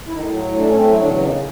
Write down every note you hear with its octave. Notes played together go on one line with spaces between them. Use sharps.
E4
A2 D#3 D#4
F#3
A2
A3 D4
C#4
A2 C4
C#4
F#3
E2 D3 D4
C#3
D#3 D#4